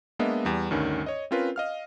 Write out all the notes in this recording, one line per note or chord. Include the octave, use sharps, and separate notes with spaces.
G#3 A#3 B3 D4 D#5 E5
E2 G3
D2 G2 D#3 C#4
C#5 D#5
C4 C#4 F4 A#4 B4
D#5 F5 F6